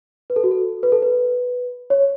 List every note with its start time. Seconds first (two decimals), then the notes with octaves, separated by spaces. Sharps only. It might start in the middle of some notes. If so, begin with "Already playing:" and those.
0.30 B4
0.36 A4
0.44 F#4
0.51 A4
0.83 B4
0.92 A4
1.02 B4
1.90 C#5